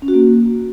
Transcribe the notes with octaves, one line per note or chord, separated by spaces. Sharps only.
C#4
F#4
A#3